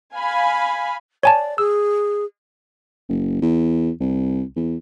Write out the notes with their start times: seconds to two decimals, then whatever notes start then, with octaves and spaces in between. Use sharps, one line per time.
0.14 F5 G#5 B5
1.23 C#5 D5 G#5 A5
1.58 G#4 E6
3.09 F#1
3.42 E2
4.01 C2
4.56 E2